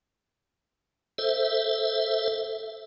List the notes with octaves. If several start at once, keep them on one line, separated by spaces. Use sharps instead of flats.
A4 C5 E5